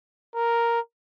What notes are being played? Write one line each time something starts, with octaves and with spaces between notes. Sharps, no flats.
A#4